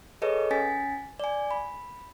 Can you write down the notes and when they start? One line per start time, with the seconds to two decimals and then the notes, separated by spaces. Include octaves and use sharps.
0.22 G#4 A4 B4 C#5 D#5
0.51 C#4 G#5 A6 B6
1.20 D5 G#5
1.51 B5